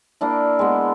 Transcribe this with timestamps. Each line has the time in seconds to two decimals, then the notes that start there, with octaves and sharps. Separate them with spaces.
0.21 A#3 D4 E4
0.59 G#3 B3